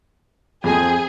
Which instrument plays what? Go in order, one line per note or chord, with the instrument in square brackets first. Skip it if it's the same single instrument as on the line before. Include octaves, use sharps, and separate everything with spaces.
[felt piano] F2 C4 [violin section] G#4